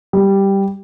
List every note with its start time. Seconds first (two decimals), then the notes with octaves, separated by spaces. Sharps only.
0.13 G3